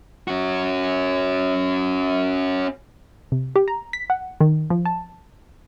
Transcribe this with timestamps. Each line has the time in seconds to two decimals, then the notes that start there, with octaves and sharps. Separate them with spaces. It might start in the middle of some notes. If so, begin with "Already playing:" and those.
0.28 C#4 F#4
3.32 C3
3.56 G4
3.68 A#5
3.93 B6
4.10 F#5
4.41 D#3
4.70 F3
4.86 A5